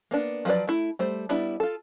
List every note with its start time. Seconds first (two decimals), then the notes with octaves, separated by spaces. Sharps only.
0.11 A#3 B3 D4
0.45 F3 F#3 F#4 B4 D5
0.67 A3 E4
0.99 G3 A3 C5
1.29 G3 B3 D4 E4
1.60 F4 A4